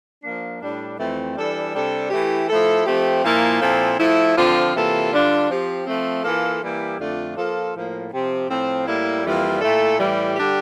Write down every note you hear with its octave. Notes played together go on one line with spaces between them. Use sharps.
F3 A#3 D4
A2 G3 D4
F2 E3 A3 C4
E3 G3 D4 A4
C3 G3 D4 A4
E3 A3 E4 G4
F3 A3 E4 A4
F3 A3 C4 G4
A#2 F3 A#3 E4
A#2 F3 C4 E4 A4
F3 A3 E4
D3 F3 C4 F4
C3 E3 A#3 F4 A4
D3 G3 D4 F4
F3 C4 G4
F3 A3 C4
E3 A#3 F4 A4
E3 G3 A#3 E4 G4
F2 D3 A3 D4 F4
F3 A#3 F4 A4
A2 F3 A#3
C3 F3 C4 G4
A2 F3 C4
A2 G3 A#3 E4
F2 E3 G3 A#3 F4
A#2 A3 E4 A4
A2 E3 G3
D3 G3 D4 G4